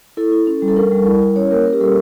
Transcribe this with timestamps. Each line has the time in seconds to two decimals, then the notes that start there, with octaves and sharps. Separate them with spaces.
0.17 E4 A4
0.32 E4
0.47 C#4
0.62 G3
0.68 A4
0.76 D4 A#4
0.92 G3
1.06 E4
1.21 E4
1.36 C#4 C#5
1.51 A#3 A#4
1.66 C#4 A#4
1.73 G4
1.80 G3 A4